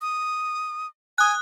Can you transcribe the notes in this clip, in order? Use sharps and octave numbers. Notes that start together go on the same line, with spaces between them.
D#6
G#5 D#6 F#6